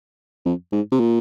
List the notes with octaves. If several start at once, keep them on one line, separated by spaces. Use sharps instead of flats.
F2
G#2
C3
A#2